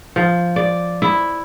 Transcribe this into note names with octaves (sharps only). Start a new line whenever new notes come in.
F3
D5
E4